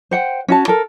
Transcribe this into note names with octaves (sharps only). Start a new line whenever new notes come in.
C5 F#5 G5
C#4 F#4 A5
A4 A#4